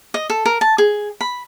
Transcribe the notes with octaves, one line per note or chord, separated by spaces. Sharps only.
D#5
A4
A#4
A5
G#4
B5